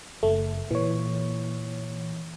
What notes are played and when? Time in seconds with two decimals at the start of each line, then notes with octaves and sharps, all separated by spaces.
0.23 F#1 A3
0.71 A#2 E3 C#5